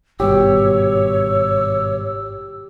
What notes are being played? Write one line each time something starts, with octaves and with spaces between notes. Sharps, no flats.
G#1 G2 B2 G4 C#5 E6